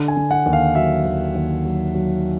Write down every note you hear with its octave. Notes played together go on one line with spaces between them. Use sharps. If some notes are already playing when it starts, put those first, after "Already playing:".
Already playing: D3
G#5
D3
F#5
D#2
F5
F#3 E5
D#2
D#2
F#3
F#3